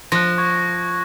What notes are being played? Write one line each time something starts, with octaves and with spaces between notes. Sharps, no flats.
F3 F#6 A#6
C#6 F#6 G#6